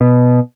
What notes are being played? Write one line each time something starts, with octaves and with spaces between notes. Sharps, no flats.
B2